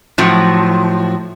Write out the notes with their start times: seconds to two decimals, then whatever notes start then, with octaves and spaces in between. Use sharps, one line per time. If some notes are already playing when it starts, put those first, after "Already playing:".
0.18 A2 F3 F#3